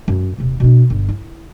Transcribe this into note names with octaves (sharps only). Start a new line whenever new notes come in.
F#2
D#1 C3
B2 D4
G1
E4